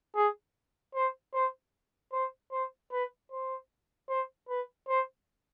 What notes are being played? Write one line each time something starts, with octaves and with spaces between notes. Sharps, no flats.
G#4
C5
C5
C5
C5
B4
C5
C5
B4
C5